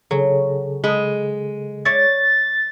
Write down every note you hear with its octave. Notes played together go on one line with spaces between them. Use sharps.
C#3 F#3 G#4 A4
G#3 B5
C#5 D5 E5 A6